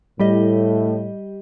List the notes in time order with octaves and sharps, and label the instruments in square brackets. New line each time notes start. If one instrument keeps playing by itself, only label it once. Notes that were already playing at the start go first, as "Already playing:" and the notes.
[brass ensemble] A2 [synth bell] G3 G4 D#5